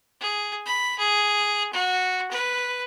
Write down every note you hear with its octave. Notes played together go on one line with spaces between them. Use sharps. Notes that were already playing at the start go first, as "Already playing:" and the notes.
G#4
B5
G#4
F#4
B4